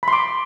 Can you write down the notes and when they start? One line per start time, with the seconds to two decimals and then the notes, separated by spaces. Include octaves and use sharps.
0.03 B5
0.08 C6
0.13 D6